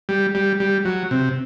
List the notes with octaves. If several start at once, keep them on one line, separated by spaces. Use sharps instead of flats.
G3
G3
G3
F#3
C3